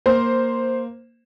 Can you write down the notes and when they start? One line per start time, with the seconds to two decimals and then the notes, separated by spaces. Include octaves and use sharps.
0.06 A#3 C5